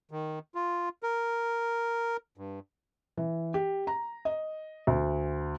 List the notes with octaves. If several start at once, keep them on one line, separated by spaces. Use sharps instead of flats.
D#3
F4
A#4
G2
E3
G4
A#5
D#5
D2